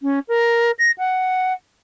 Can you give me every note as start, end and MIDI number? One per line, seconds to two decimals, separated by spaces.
0.02 0.19 61
0.28 0.71 70
0.79 0.91 94
0.98 1.53 78